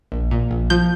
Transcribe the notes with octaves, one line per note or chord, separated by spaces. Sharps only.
A#1
A#2
A#1
F3 G6